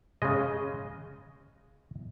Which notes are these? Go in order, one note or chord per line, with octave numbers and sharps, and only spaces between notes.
C#3 G#3 D#5